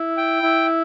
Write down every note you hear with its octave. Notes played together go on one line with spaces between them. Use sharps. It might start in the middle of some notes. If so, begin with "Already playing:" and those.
Already playing: E4
G5
E4